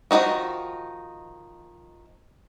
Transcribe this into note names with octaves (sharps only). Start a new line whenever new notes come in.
D#3 F3 F#3 D#4 F#4